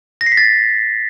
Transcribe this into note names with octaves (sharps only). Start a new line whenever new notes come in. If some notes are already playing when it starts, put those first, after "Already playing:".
A#6
C7
B6
A6